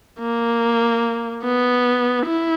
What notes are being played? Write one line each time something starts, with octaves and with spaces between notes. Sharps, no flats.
A#3
B3
E4